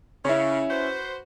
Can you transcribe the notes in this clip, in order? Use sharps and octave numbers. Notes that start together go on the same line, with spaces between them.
C#3 C#4 E4
F#4 B4 C5